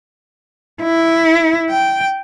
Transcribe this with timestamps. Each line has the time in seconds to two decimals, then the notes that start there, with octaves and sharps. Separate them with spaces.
0.83 E4
1.70 G5